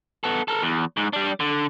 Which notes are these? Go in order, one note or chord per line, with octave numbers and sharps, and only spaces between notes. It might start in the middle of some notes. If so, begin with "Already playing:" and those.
B3 A4
A4 A#4
E2
G#2
G3 D4
D3